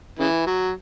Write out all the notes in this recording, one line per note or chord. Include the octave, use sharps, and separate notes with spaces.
C#3 E3
F#3